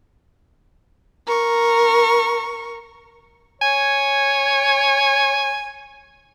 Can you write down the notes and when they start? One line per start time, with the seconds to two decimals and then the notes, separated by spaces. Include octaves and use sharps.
1.27 A#4 C#6
3.62 C#5 G#5